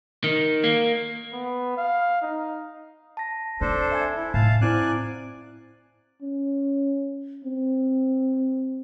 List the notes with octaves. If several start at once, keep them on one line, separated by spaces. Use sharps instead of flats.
D#3
A#3
B3
F5
D#4
A5 A#6
C4 D4 A4 C5
E5 G#5 G#6
E4
A2 F5 A5
C4 E4 C5 D5 G#5 F#6
C#4
C4